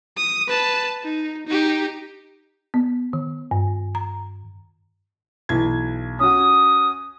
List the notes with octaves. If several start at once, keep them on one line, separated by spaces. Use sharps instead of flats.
D#6
B4 A5
D#4
D#4 G4
B3
D#3
G2
A#5
B1 E3 G#6
C#4 F#4 D#6